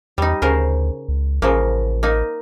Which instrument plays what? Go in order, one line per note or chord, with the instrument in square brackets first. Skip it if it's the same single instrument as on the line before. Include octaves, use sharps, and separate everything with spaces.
[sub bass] E2 [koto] G3 D#4
[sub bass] D2 [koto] C#3 A#4 C5
[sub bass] C#2
[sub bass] A1 [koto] C#3 F3 A#3
[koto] A#3 D#4